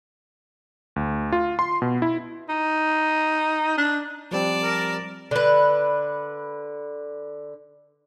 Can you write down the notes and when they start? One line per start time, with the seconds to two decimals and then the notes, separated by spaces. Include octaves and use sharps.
0.96 D2
1.32 F4
1.59 C6
1.82 B2
2.02 E4
2.49 D#4
3.78 D4
4.31 F3 G3 C4 D5 A5
4.63 A#4
5.31 D3 B4